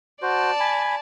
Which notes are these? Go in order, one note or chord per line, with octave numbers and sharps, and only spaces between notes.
F#4 C5 D5 A5
G#5 B5